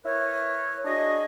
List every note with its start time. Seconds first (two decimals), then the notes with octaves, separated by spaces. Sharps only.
0.05 E4 A#4 B4 C#5
0.84 D4 F#4 G#4 D#5